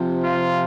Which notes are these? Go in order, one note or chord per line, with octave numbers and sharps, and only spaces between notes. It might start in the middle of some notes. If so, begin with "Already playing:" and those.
Already playing: C3 F3
F4